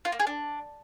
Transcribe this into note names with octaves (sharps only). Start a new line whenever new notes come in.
F4
A#3
G#4
D4